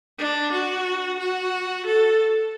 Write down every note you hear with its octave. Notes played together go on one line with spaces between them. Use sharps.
D4
F#4
F#4
A4